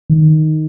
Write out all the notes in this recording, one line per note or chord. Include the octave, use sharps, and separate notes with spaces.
D#3